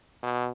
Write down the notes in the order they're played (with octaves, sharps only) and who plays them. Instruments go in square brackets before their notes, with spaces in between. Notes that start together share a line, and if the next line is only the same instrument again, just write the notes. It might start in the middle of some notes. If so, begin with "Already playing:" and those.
[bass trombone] B2